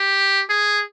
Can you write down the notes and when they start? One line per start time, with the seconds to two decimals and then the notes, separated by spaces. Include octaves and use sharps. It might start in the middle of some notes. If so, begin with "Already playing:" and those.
Already playing: G4
0.50 G#4